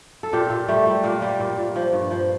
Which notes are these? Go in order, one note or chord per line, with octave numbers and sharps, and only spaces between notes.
A4
A#2 G4
A#2
G3 A3
G3
A#2 A#3
G3
A#2
A#2
F3
G2
F3